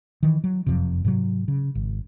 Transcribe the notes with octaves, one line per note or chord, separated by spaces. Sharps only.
D#3 E3
F#3
F#1 F2 C3
G#2 C3 D#3 F#3
C#3
G#1